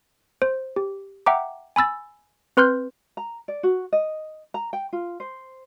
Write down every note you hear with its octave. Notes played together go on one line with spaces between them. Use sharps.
C5
G4
E5 F#5 G5 A#5 D6
G#5 B5 E6 A6
C4 B4 C6 F6 G6
A#5
D5
F#4
D#5
A#5
G5
F4
C5